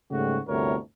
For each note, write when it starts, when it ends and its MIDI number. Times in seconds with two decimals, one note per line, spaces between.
0.11 0.38 44
0.11 0.38 49
0.11 0.38 55
0.11 0.38 57
0.11 0.38 66
0.48 0.75 31
0.48 0.75 38
0.48 0.75 45
0.48 0.75 48
0.48 0.75 70
0.48 0.75 73